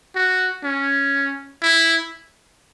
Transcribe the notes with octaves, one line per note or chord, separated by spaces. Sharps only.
F#4
C#4
E4